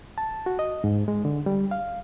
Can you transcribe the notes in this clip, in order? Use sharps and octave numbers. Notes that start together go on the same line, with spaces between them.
A5
F#4
D#5
G#2
G#3
D3
G3
F5